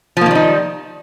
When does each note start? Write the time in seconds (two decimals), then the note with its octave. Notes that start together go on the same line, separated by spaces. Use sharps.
0.17 F3
0.21 A#3
0.26 D#3
0.31 G3
0.35 D#4